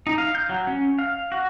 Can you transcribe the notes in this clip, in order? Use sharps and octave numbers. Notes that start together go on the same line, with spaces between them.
D#4
F5
G6
F#3
C#4
F5
F#4